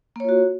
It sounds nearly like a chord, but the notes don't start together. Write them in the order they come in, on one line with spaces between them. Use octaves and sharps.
A#3 C#5 F4 F#4